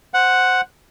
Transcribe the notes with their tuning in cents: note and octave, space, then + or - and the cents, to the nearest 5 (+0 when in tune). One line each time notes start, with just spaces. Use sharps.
C5 +0 F#5 +0